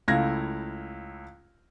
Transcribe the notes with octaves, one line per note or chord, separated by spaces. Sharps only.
C#2 A3 E4 F5 G#6 A#6